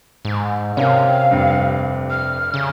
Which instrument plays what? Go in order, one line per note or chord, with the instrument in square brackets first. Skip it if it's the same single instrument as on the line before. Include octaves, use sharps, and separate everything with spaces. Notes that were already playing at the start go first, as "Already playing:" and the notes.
[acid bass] G#2
[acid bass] C3 [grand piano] C#4 A#4 [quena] F5
[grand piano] F1 G2
[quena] F6
[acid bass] C#3